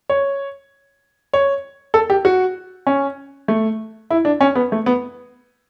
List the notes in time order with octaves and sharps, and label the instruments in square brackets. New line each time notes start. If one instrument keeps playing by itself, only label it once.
[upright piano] C#5
C#5
A4
G4
F#4
C#4
A3
E4
D4
C#4
B3
A3
B3